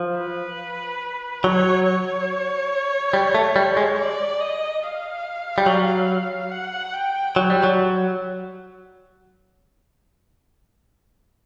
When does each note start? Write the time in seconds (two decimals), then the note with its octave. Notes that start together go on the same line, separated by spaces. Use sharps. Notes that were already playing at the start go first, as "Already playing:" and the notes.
Already playing: F3
0.17 B4
1.44 F#3 C#5
1.86 C#5
3.13 G3
3.35 A3
3.56 G3
3.77 G#3
3.98 D5
4.40 D#5
4.83 F5
5.58 G3
5.66 F#3
6.52 F#5
6.93 G5
7.36 F#3
7.50 G3
7.64 F#3